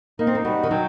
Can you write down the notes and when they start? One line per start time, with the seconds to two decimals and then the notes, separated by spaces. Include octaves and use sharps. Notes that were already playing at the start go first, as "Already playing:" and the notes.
0.19 A#3 D#4
0.27 C4
0.35 A#3
0.45 G3 F#4
0.63 D#3
0.71 F#3 G5